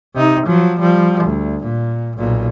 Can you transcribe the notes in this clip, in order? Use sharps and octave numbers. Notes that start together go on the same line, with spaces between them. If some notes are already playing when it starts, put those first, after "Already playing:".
C3 D#4
F3 F#3
F3 G3
D2
A#2
B1 A#2